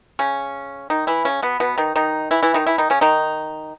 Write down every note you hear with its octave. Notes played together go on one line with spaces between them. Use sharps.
C#3 C#4
D#3 D#4
E3 E4
C#3 C#4
B2 B3
B2 B3
D#3 D#4
D#3 D#4
E3 E4
E3 E4
D#3 D#4
E3 E4
D#3 D#4
C#3 C#4
D#3 D#4